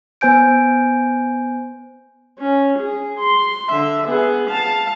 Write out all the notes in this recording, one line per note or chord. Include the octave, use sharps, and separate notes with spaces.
B3 C5 G#5 G6 D7
C#4
G#4
C6
D3 E5
B3 G#4
F5 A5